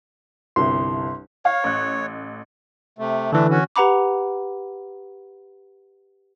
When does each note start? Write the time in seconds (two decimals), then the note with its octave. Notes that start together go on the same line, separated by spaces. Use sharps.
0.56 G1 C2 C6
1.45 C#5 F5
1.64 A1 F#6
2.98 C3 A3
3.32 D3 E3 A3 D4
3.50 C#4 F#4
3.76 G4 B4 F#5 A#5 B5 D6